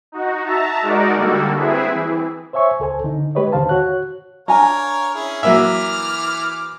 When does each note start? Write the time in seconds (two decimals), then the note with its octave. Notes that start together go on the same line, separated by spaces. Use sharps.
0.12 D#4 F#4
0.44 E5 A5 A#5
0.82 G#3 D#4 F#4 A#4 D5
1.15 D3 G3 A#3 F#4 A4
1.55 C4 E4 G#4 B4 E5
1.93 E3
2.53 C5 C#5 E5 G#5 C#6
2.80 C#2 A4 C5 G#5
3.04 D3 D#4
3.35 G#3 G4 B4 C#5 D#5
3.52 D#2 D3 D#3 C5 F5 A5
3.69 F#4 C#5 F#6
4.48 D4 A#4 C#5 F5 G#5 A#5
5.14 C#4 E4 G#4
5.43 E3 F#3 A#3 E5 D6 F6